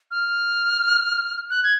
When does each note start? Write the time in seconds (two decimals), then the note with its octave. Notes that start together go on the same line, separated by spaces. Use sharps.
0.11 F6
1.50 F#6
1.64 G#6